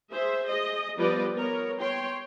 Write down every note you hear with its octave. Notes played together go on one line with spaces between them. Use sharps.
G#4 C5 E5
G#4 D#5
F3 G3 B3 B4 D5 D#5
B3 A#4 C#5
C#5 G5 C6